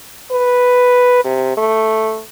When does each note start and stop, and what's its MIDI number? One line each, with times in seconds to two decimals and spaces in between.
0.32 1.23 71
1.24 1.57 48
1.57 2.22 57